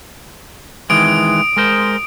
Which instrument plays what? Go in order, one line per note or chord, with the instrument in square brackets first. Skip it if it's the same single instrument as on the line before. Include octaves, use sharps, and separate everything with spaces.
[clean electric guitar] D#3 E3 G#3 [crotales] D#6 D7
[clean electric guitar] G#3 A#4 C5